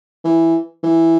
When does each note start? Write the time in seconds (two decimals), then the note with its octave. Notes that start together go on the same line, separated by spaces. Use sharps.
0.25 E3
0.84 E3